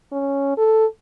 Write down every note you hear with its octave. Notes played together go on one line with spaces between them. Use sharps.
C#4
A4